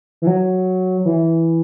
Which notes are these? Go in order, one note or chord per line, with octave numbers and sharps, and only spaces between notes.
E3
F#3
E3